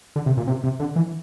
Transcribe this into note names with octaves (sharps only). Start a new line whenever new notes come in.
D3
C3
A#2
C3
C3
D3
E3